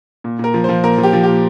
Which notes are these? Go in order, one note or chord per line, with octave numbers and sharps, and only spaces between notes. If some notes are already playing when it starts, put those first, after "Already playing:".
A#2
A#2 A#4
F3
F3 C5
A#2 A#4
F3
G4
F3
A#2 G4